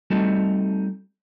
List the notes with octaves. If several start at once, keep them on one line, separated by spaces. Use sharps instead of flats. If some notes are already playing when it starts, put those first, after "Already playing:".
G3 A3 C4 D#4 F#4 A4